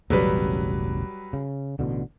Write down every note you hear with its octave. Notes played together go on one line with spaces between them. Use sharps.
E1 A1 C#3 F#3 G3 B4
C#3
A1 B2 D3